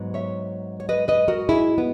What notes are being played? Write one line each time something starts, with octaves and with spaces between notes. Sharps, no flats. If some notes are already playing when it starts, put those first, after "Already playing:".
Already playing: G#2 F#3 B3
C#5 E5
C#5
B4 D#5
B4 D#5
F#4 A#4
E4 G#4
B3